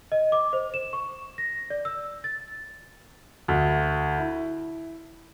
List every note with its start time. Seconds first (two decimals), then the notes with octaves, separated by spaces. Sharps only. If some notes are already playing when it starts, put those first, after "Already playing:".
0.12 D#5
0.32 D6
0.53 C5
0.74 E7
0.93 C#6
1.38 A#6
1.70 D5
1.85 E6
2.24 A6
3.48 D2
4.18 E4